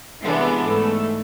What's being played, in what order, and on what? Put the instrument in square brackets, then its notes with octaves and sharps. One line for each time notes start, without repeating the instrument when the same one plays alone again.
[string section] C3 E3 G#3 B3 D4
G#2 A3